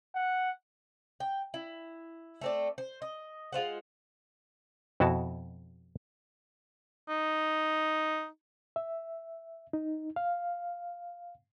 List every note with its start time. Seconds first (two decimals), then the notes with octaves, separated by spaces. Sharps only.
0.15 F#5
1.20 G5
1.54 E4
2.41 A3 C4 D5
2.78 C5
3.02 D#5
3.52 G#3 F4 C5 F#5
5.00 F2 B2 E4 F#4 A5
7.09 D#4
8.76 E5
9.73 D#4
10.16 F5